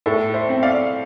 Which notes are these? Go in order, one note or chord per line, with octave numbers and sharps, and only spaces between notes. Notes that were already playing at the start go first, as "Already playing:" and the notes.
A2 A4
C5 E5
C4
D5 F5